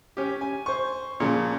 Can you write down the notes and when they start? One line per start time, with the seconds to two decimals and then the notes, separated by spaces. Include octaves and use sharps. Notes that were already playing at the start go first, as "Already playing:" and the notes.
0.17 C#4 G4
0.41 G#5
0.66 C5 C#6
1.20 A#2 C#3 F3